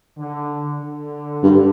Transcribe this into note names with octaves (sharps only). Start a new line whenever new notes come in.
D3
D3
G2